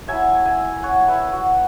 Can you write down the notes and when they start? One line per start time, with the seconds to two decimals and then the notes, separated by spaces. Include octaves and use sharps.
0.08 F#3 E4 E5 G#5
0.45 E5 G#5
0.83 C#5 F#5
1.08 B4 E5
1.33 F#4